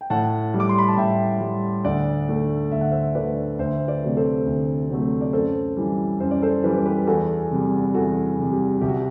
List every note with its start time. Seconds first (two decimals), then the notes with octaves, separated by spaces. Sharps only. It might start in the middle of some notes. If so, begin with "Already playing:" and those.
0.01 G5
0.10 A2 F#5 A5
0.54 G3
0.60 D6
0.69 C6
0.78 B5
0.88 A5
0.97 A2 E5 G5
1.41 G3
1.84 D2 D5 F#5
2.29 D3 A3
2.71 D2 E5
2.81 F#5
2.91 C5 E5
3.15 D3 A3 B4 D5
3.59 D2 C5 E5
3.88 B4 D5
4.02 C3 F#3 A3
4.17 A4 C5
4.46 D2
4.90 C3 F#3 A3
5.21 D5
5.33 F#2 A4 C5
5.77 E3 G3
6.20 F#2 C5
6.31 D5
6.42 A4 C5
6.64 E3 G3 B4
6.74 C5
6.85 G4 B4
7.07 E2 F#4 A4
7.51 C3 G3
7.94 E2 F#4 A4
8.38 C3 G3
8.52 G4
8.81 C2 G4
8.88 F#4